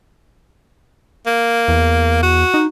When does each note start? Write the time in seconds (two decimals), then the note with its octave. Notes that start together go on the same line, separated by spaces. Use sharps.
1.26 A#3
1.68 E2
2.23 F#4
2.54 D#4